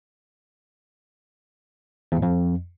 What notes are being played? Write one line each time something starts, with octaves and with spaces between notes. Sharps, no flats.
E2
A2
F2